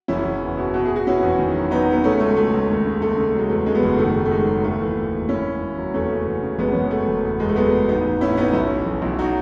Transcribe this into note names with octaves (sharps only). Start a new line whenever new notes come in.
F#1 C#4 E4
F#1
E2
B2
B2
G#4
B2
F#4
B2 C#4 E4
E2
D#3
F#3
F#3 B3 D#4
F#3 B3
C#3 A3 C#4
C#2 A3
C#2 A3
C#2
D#2
C#3
D#2 A3
C#3
F#3 G#3
E2 A3
C#3 G#3
B3
F#1 A3
D#3 A3
D#3
A3
D#3 G#3
F#3
D#2 A3
E3
D#2
E1
D#2 C#4 E4
D#2
D#2
F#3
E2 A3 C#4
C#3
E2
C#3
F#1 G#3 B3
F#1 C#4
B3
C#3 A3
F#1
E2
E2 G#3
A3
F#3 G#3 B3
E2
A1 B3 D#4
A1
A2 C#4 E4
A1 B3 D#4
B1 C#4 E4
E3
B1
B1
F#3 D#4 F#4